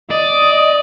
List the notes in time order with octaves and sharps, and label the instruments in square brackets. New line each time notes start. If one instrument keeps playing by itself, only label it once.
[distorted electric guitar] D5 [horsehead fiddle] D#5